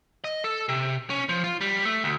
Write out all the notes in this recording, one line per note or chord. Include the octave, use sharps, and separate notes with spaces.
D#5
A4
C3
C#4
F3
F4
G3
A3
D2